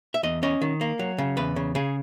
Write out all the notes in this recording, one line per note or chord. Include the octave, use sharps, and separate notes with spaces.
E5
E2 D#5
C#4 D#5
D#3
A#3
F#3
C#3
E2 B4
C#3
C#3 G#4